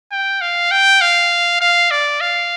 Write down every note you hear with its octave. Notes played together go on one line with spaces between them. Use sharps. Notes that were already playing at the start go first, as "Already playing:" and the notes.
G5
F5
G5
F5
F5
D5
F5